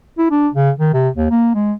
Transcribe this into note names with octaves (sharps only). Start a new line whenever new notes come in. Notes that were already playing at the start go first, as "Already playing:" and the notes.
E4
D4
C#3
D#3
C3
D#2
A#3
G#3